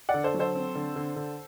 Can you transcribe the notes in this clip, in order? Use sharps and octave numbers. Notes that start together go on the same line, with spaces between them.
D5 F#5
D3
A4 C5
F#3
A4 C5
C4
D3
D3
D3